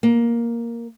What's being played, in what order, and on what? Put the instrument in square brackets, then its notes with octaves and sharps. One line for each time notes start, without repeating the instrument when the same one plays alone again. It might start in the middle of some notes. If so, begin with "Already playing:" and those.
[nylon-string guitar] A#3